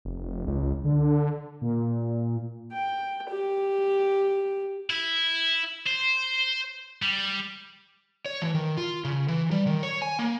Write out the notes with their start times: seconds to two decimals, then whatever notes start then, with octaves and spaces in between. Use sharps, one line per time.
0.05 F1
0.47 C#2
0.84 D3
1.61 A#2
2.73 G5
3.30 G4
4.90 E4
5.87 C5
7.02 G3
8.26 C#5
8.42 E3
8.55 D#3
8.77 F4
9.04 C#3
9.28 E3
9.51 G3
9.67 D#3
9.83 C#5
10.02 G#5
10.19 A#3